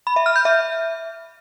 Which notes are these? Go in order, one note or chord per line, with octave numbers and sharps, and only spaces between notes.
B5
E5
F6
G6
E5